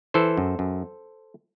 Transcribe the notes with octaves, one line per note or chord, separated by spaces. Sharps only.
E3 A4 C5
F#2
F#2